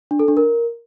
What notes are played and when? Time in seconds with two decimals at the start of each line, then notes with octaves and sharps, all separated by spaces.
0.11 D4
0.19 A4
0.28 D4
0.37 A#4